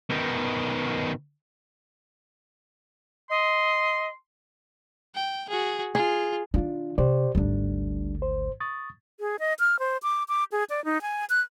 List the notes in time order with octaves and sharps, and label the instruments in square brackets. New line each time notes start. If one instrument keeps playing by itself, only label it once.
[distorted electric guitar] B2 D#3
[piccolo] D#5 [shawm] C6
[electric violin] G5
F#4 G#4
[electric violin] F4 [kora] G#4
[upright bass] D#3 E3 [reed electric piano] D4 F4
[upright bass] C3 [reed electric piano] G4 C5 D5
[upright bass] G#1 D2 [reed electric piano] G3 D4
[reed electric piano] C5
C#6 D#6 A6
[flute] G#4
D#5
F6
C5
D6
D6
G#4
D5
D#4
G#5
F#6